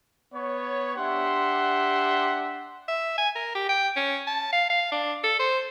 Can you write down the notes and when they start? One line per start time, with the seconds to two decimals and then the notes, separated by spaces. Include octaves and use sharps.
0.34 B3 C#5
0.97 D4 G4 E5 F#5 C6
2.88 E5
3.18 G#5
3.36 A#4
3.55 G4
3.69 G5
3.96 C#4
4.27 A5
4.52 F5
4.70 F5
4.92 D4
5.24 A4
5.39 C5